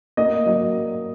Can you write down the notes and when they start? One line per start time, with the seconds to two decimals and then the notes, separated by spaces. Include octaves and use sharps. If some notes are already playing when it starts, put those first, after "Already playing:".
0.17 A#3 D#5
0.46 F#3 D#5